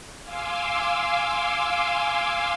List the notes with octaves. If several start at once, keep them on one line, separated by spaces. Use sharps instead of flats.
F5 G#5 C6 D6 E6